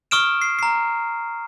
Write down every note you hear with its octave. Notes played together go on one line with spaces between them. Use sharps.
C#6 D#6 F6 D7 E7
C7
A#5 C7